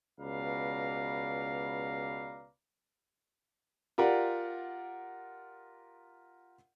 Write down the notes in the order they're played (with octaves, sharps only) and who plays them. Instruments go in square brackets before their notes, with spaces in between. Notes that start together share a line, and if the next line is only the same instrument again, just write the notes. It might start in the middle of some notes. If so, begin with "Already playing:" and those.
[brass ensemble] C#2 B2 B4 D5 F5 A#5
[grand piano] F4 G4 A#4 D5 F#5